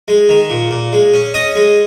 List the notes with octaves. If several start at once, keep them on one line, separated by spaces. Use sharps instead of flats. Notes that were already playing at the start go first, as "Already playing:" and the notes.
G#3
D#3
A#2
A#2
G#3
C#4
C#4 D#5 D#6
G#3